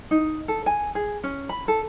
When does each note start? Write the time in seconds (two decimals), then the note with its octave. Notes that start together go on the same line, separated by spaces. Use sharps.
0.11 D#4
0.48 A4
0.66 G#5
0.95 G#4
1.24 C#4
1.49 B5
1.68 A4